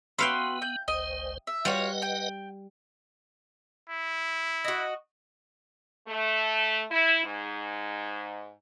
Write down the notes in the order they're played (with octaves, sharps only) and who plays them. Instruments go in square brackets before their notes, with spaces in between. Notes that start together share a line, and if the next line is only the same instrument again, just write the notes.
[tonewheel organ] B3 [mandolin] F#4 B4 C6 [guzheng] E5 F5 G5
[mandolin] G6
[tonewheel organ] G1 C#2 C5 [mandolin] D#5
[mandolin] E5
[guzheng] G3 [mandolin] F4 F#4 C#5 [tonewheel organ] B4 D#5 F#5
[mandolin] G5
[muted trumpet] E4
[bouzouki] F#4 D#5
[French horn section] A3
E4
G#2